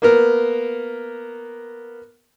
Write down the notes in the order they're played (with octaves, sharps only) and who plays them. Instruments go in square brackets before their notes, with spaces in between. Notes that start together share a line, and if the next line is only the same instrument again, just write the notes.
[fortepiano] A#3 B3 A#4